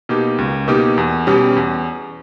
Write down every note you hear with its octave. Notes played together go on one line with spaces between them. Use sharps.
B2 A#3 D#4 G4
C#2
B2 A#3 D#4 G4
E2
B2 G3 C#4 G4
E2